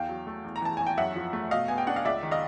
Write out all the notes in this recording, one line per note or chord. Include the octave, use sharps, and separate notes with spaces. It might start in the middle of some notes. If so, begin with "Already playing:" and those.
Already playing: E2 F5 G5
F#3
A3
E2
A#5
E3 A5
E2 G#5
G5
F#2 E5 F#5
F3
A3
B2 D#5 F5
B3 G#5
G5
D4 F#5
F5
C#2 D5 E5
D#3
D#5 F5